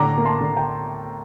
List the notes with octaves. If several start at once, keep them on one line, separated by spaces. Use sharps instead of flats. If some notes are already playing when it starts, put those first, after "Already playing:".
Already playing: A2 D3 A#5 D6
A#3
A5 C6
D3
G5 A#5